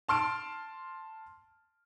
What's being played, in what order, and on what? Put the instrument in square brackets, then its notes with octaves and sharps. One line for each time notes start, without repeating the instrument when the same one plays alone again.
[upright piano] A5 C6 F6 D7